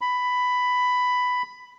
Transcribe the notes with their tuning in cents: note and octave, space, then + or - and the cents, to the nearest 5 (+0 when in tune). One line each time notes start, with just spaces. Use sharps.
B5 +10